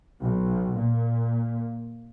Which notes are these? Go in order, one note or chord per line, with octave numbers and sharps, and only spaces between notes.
B1
A#2